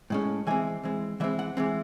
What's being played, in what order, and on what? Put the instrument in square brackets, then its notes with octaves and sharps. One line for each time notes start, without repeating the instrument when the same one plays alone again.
[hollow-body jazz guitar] A2 G#3 C#4
E3 G#3 C4 G#5
E3 G#3 C4
E3 G#3 C4 E5
F#5
E3 G#3 C4